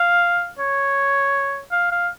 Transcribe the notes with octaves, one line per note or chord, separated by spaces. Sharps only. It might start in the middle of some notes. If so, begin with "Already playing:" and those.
Already playing: F5
C#5
F5
F5